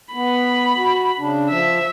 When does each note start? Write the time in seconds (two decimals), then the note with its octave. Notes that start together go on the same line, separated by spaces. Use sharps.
0.14 B3 B5
0.77 F#4
1.19 C#3 D4
1.50 F3 E5